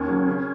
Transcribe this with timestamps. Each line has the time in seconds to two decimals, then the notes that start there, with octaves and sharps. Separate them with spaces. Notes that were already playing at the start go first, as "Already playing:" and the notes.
Already playing: D#2 C#4
0.08 C#3 F#3
0.27 C#3